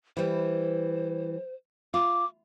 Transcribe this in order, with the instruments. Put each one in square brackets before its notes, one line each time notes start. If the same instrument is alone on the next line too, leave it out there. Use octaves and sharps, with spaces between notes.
[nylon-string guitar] E3 G3 [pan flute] C5
[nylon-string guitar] F4 [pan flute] D6